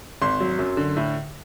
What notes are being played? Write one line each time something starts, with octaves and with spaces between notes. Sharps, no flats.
G#1 C6
F#3
F#2
D3
A2